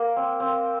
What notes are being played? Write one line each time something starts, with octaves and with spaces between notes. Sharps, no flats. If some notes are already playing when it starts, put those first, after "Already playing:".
Already playing: A#3
C4
C4